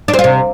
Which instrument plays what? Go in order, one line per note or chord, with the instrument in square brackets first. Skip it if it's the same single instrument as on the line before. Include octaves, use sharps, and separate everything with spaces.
[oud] D4
C4
F4
C3